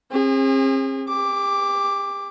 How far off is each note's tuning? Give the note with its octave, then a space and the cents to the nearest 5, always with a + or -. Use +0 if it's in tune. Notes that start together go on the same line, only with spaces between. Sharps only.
C4 +45 G#4 -35
G4 +40 D6 +0